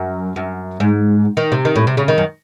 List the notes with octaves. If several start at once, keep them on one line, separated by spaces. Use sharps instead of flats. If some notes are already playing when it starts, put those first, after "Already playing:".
Already playing: F#2
F#2
G#2
D#3
C3
D#3
A2
C3
C#3
D#3
F#2